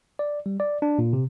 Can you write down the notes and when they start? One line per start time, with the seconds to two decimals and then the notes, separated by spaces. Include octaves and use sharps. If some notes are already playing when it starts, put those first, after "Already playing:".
0.19 D5
0.46 G3
0.60 D5
0.82 D4
0.99 A#2
1.13 C3